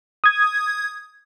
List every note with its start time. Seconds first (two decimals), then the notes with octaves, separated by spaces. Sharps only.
0.24 D#6 G#6